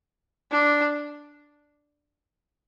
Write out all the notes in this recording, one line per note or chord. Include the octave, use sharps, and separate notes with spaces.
D4